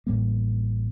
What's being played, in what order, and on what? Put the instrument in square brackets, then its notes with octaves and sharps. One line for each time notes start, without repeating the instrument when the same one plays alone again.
[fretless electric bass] A1 A2 G3 A#3